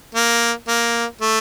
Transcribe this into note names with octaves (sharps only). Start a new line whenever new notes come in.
A#3
A#3
A3